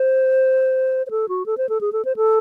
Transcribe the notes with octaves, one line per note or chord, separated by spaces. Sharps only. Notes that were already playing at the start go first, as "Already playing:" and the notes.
Already playing: C5
C5
A4
F#4
A4
C5
A4
G#4
A4
C5
A4